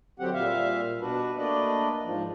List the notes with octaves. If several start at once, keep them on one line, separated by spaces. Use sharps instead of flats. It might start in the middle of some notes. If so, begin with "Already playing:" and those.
D3 F#3 C4 G4 F#5
A#2 G3 E5 F5
B2 D4 F#4 B4
A3 A#3 D4 B4 D5 D#5
G#2 F3